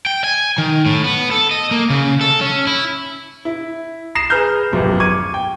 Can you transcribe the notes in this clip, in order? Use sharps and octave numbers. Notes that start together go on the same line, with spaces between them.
G5
G#5
D#3
A2
B3
A4
D#5
A#3
C#3
A4
C#4
E4
E4
D#6 A#6 C7 E7
G#4 B4 A#5 F6 G6
D1 G#1 F#2 F3 B3 G4
C#6 D6 G#6 D#7
G5